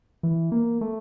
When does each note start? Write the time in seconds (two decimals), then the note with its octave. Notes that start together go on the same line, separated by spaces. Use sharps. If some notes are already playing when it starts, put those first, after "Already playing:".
0.23 E3
0.52 A#3
0.81 A3